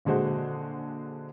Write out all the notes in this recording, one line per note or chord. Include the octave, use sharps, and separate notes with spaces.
A#1 D3 G#3 F#4 C5